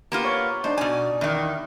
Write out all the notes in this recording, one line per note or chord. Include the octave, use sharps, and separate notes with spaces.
A#3 B3 F4 G4
C#5
D4 D#4 C5
B2 G#5
E2 D#3 D#4